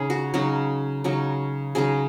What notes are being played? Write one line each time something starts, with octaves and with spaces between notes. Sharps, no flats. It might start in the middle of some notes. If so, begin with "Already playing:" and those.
Already playing: C#3 D#4 G#4
F#4
C#3 F#3 D#4
C#3 F#3 D#4
C#3 F#3 D#4 G#4